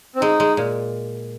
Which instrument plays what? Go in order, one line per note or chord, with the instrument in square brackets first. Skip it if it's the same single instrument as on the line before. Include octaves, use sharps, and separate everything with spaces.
[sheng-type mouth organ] C4
[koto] G#3 [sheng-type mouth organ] D#4
[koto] G#3
A#2